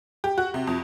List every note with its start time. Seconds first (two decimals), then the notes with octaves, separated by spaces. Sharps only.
0.24 G4
0.38 F#4
0.54 C3
0.67 F2